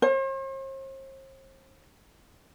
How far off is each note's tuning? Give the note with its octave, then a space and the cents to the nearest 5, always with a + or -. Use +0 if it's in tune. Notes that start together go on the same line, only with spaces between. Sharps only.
C5 +45